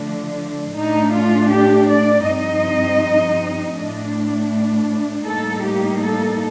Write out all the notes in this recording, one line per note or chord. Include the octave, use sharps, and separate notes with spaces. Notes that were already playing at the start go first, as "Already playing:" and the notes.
Already playing: D3 F3 A3 D4
A2 A3 D4 D#4
F4
G4
D5
G2 F3 C4 D#4 D#5
A2 A3 D4
A2 G3 A#3 D#4 A4
G4
A4